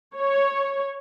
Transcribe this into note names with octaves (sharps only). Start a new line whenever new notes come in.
C#5